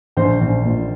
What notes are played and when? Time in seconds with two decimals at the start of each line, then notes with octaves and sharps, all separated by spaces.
0.17 A#1 C5
0.41 A#1
0.65 A#2